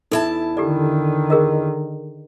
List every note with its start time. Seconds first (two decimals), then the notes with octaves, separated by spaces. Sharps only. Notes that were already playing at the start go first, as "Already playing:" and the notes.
0.11 E2 D#4 E4 A4 E5 A5
0.57 D3 D#3 G4 A4 D5
1.30 G#4 A#4 D#5